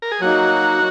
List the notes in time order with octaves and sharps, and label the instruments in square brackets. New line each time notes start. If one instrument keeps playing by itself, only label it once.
[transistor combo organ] A#4
G#4
[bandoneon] F#3 A#3 D#4 [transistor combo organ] F#4